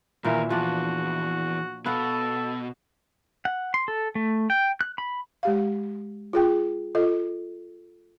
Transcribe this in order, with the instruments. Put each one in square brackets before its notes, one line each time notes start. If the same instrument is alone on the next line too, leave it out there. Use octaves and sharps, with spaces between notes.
[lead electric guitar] D#2 [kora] A#2 E3 E5 [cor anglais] A#4
[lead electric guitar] E2 [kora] F3 D4 [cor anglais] F#4
[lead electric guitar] B2 [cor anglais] A4 [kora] B4 F5 F#5
[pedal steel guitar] F#5
C6
A4
A3
G5
F#6
B5
[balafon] G#3 G4 F5
F4 G#4 G5
F4 A4 D#5